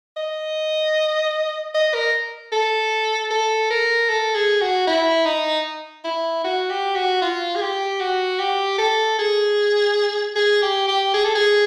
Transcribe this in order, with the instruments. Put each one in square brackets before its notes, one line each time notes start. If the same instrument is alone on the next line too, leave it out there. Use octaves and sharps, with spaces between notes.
[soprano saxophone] D#5
D#5
A#4
A4
A4
A#4
A4
G#4
F#4
E4
D#4
E4
F#4
G4
F#4
F4
G#4
G4
F#4
G4
A4
G#4
G#4
G4
G4
G#4
A4
G#4